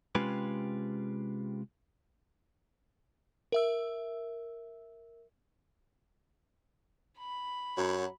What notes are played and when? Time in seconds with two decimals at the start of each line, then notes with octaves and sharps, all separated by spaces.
0.15 C3 G#3 C#4 F4 G4 B4
3.52 A#4 E5 E6
7.18 B5
7.77 F#2 F#3